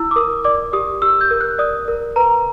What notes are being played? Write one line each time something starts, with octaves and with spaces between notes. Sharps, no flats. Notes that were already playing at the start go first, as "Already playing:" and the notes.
Already playing: E4 E6
D6
A#4 D#6
D5 D6
G4 D#6
G4 E6
G6
A#4
F#6
D5 D#6
A#4
B4 A#5